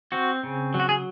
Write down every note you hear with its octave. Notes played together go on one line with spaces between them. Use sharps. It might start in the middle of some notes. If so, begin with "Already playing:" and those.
C4 F#4
C#3
F#3
F#4
G#4